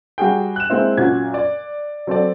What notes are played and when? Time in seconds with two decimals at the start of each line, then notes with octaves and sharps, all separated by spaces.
0.18 G3 F#4 G#4 G5
0.56 F#6 E7
0.70 G#3 A#3 C4 E4
0.97 F#2 A#2 F#4 G#6
1.34 D5
2.07 F#3 C4 A4 D5